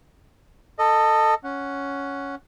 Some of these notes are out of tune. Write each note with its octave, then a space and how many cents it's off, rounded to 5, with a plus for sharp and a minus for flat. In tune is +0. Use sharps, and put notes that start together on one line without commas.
A4 +15 D#5 -10
C#4 +5 F#5 +0